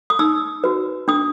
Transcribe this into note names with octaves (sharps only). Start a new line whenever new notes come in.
D#6
D#4 E6
F#4 B4
D4 D#6